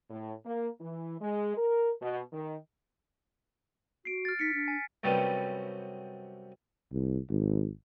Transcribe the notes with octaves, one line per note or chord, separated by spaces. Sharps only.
A2
A#3
E3
G#3
A#4
B2
D#3
F#4 C7 D7
F6 A6
D#4 B6 C#7
D4
G#5
F#2 C3 G3 A3 B3 C#4
C2
G#1